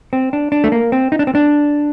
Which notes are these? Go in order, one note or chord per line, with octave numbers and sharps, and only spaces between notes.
C4
D4
D4
A3
A#3
C4
D#4
D4
C4
D4